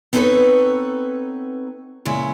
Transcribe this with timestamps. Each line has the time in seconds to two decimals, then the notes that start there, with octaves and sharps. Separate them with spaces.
0.13 B3 C4 D#4 A4 B4 C#5
2.05 A#2 C#3 G#3 E4